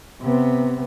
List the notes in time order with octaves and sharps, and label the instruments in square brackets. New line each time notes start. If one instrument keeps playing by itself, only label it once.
[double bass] C3 B3